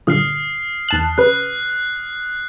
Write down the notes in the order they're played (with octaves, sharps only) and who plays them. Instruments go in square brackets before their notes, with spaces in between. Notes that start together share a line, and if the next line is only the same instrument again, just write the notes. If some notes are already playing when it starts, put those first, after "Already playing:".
[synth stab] G2 A#2 D3 [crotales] D#6 F6 C7
[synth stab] E2 A5 F#6
[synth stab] C#3 B4 [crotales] F#6